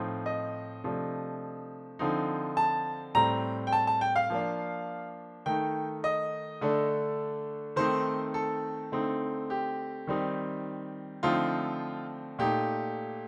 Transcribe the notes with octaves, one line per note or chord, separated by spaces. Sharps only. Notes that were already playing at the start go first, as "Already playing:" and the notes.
Already playing: A2 F3 C4 D#4
D#5
C3 F3 A3 D4
D3 F3 C4 D#4
A5
A2 G3 C4 A#5
G5
A5
A5
G5
F5
F3 A#3 D4
D#3 A3 D#4 G5
D#5
D3 A3 D4
D#3 A3 C4 D#4 C5
A4
D3 A3 C4 D#4
G4
D#3 G3 C4 D#4
D3 F3 A3 C4 D#4 F4
A#2 A3 D#4 G4